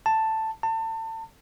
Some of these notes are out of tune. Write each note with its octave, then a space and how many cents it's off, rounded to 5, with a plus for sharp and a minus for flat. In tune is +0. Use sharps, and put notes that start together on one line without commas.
A5 +5
A5 +30